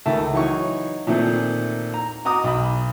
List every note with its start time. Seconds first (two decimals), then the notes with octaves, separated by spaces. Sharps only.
0.06 C#2 D#3 A3 A5
0.33 E3 F#3 D#4 C#5 C#6
1.07 A#2 D#3 F3 A3 C4
1.94 A#5
2.25 F#4 D#5 A#5 D6 D#6
2.44 B1 B5